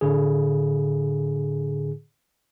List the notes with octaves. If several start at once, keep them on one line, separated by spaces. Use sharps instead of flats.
A2 D3 G#4